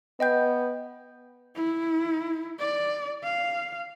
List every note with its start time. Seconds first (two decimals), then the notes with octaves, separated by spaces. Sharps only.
0.20 B3 D#5 G5 G6
1.55 E4
2.59 D5
3.23 F5